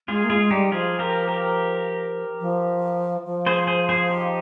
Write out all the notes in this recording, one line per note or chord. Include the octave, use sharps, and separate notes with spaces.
G#3 F4 G#4
A#3
G#3 F4 G#4
G3 D#4 G4
F3 F4 G#4
G4 A#4
G4 A#4
F3
F3
G#4 C5
G#4 C5
G#4 C5
D#4 G4